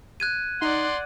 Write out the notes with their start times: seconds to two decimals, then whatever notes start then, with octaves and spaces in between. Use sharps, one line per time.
0.20 F#6 G#6 D#7
0.62 D#4 D5 F#5 C6